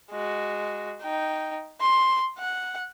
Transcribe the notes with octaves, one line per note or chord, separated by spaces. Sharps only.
G#3 F#4
D#4 G5
C6
F#5